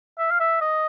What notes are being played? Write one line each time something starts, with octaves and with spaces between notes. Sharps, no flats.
E5
F5
E5
D#5